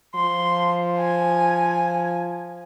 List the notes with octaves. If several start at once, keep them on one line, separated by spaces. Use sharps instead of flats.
F3 C6
G#5